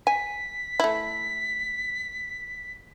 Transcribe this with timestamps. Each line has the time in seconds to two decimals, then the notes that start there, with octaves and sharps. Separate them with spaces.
0.07 G#5 B6
0.80 A3 E4